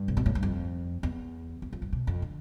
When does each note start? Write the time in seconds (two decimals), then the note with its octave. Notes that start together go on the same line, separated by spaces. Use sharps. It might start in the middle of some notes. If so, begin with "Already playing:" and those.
Already playing: G2
0.08 C3
0.17 B2
0.26 A2
0.35 G2
0.43 F2
1.03 E2
1.62 E2
1.73 F2
1.82 G2
1.92 B2
2.07 F2
2.22 D3